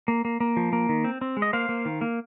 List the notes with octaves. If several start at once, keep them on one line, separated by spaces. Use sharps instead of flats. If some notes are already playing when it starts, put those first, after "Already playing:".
A#3
A#3
A#3
F3
A#3
D#3
C4
C4
G#3
D#5
A#3 C5 F5
A#3
D#3
A#3